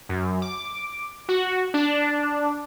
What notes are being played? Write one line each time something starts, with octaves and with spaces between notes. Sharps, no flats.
F#2
D6
F#4
D4